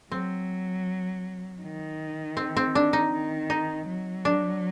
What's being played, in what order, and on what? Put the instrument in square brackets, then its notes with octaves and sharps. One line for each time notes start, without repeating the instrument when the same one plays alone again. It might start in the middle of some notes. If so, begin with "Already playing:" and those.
[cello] F#3 [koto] C4
[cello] D#3
[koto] C4
C4
D4
D#4
[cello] D#3
[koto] D#4
[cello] F#3
[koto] D4